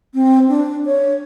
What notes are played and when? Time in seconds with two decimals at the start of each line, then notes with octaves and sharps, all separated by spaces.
0.14 C4
0.49 D4
0.85 C#5